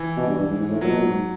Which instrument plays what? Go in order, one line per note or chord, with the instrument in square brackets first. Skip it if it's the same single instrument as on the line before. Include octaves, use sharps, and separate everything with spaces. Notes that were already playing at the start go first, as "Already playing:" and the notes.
Already playing: [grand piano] E3
[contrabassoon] B2
G2
G2
G#2
G#2
A2
[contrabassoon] A#2 [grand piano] F#3
[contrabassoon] B2
A#2
G#2